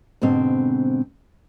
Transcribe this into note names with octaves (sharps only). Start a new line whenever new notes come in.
G#2 B2 D3 C4